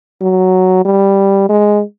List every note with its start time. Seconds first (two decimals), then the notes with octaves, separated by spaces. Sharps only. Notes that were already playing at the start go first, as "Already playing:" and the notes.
0.21 F#3
0.85 G3
1.49 G#3